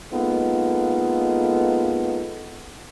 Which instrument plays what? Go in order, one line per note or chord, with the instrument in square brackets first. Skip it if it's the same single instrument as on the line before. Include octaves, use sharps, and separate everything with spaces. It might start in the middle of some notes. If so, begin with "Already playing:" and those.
[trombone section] G#3 A#3 B3 D#4 F4 A4